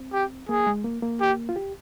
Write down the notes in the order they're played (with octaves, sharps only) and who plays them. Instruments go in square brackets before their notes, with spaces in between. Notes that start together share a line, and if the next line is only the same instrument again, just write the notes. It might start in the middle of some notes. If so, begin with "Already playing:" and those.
Already playing: [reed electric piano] C4
[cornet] G4
[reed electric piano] A#3 [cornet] G#4
[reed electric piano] G#3
A#3
A#3
[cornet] G4
[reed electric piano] F4
G4